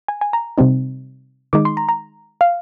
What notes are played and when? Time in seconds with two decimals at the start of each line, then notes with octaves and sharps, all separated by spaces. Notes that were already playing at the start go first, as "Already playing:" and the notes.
0.08 G#5
0.21 G#5
0.33 A#5
0.58 C3 G3 C4 D#4
1.53 D#3 G#3 D#4 D6
1.65 C6
1.77 A#5
1.89 A#5
2.41 F5